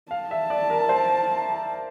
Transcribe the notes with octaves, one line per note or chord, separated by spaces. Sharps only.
F5 A5
E5
D5
A#4
C5